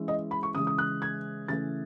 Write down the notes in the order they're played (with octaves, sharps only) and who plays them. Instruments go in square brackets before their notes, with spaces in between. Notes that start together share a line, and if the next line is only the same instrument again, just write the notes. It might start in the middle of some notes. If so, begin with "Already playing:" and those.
Already playing: [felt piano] E3 G#3 C#4 E4
D#5
B5
C#6
C#3 E3 G#3 D#6
D#6
F#6
G#6
C#3 E3 A3 E4 A6